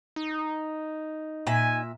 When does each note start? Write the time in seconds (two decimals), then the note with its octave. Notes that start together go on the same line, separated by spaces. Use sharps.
0.16 D#4
1.47 A#2 E5 G#5